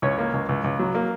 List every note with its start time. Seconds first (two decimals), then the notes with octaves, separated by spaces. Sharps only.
0.02 C#2 C#4 C#5
0.18 A#3
0.34 C#2
0.49 C#2
0.64 C#2
0.79 F#3
0.95 A#3